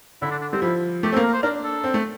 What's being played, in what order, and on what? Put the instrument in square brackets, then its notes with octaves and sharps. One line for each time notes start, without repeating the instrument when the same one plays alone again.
[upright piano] D3 [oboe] E4
[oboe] D4
D4
[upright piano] G3 [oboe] C4
[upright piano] F3 [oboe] E4
[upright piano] A3 [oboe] G4
[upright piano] C4 [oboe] A4
[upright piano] A#3
[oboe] A#4
C5
[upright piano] D4 [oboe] A#4
[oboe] A4
[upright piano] C4
A3